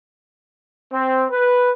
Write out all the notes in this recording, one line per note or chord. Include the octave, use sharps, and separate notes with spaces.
C4
B4